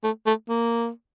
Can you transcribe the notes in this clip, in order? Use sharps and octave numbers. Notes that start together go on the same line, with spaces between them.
A3
A3
A#3